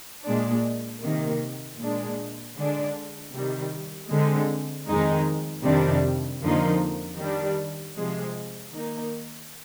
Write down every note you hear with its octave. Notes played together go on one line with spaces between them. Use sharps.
A#2 G#3 D4
C3 D#3 A#3
A#2 G#3 D4
D3 G#3 D4
C3 D#3 G3
D3 G#3 C4
F2 D#3 G#3 D#4
F2 C3 D#3 G3 D4
F2 D3 F3 A#3 D#4
D#3 G3 D4
C3 F3 G#3
D#3 A#3 D#4